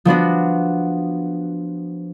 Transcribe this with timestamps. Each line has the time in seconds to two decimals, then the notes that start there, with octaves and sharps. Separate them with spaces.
0.05 F3 B3 D4 F#4